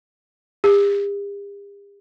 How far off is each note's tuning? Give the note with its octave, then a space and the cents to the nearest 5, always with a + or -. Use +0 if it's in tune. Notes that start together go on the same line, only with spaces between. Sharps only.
G4 +45